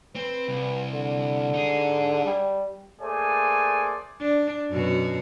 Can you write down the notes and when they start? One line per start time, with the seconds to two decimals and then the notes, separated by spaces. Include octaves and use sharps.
0.15 C4 B4
0.48 C2
0.92 D3
1.54 D#4 G#4
2.25 G3
3.01 A3 A#3 G#4 C5 D5 G#5
4.21 D4
4.72 F#2 B2 F#4